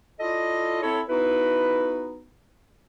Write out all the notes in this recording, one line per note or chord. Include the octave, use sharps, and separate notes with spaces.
E4 F4 A4 D5 D#5
C4 E4 A4 C#5
B3 D#4 E4 F#4 B4